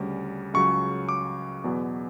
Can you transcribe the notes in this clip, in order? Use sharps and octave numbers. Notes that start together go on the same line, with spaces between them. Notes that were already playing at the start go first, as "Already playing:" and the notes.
Already playing: D2 C#3 G3 C#4
C#2 C#3 F#3 C#4 C#6
D6
E2 B2 F#3 B3